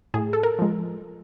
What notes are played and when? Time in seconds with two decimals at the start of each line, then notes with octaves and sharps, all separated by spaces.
0.14 A2 G#4
0.33 A4
0.43 A#4
0.59 F3 G#3